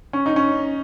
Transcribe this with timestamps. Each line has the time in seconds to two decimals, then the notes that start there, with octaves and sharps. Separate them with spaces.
0.13 C#4
0.26 D#4
0.36 C#4